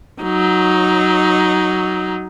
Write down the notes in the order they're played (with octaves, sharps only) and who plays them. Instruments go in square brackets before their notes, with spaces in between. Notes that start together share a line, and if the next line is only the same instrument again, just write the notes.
[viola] F#3 D#4